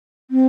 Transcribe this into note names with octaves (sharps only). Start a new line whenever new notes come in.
C4